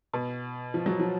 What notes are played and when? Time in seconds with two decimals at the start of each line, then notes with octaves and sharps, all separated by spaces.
0.14 B2
0.74 F3
0.86 F#3
0.99 F3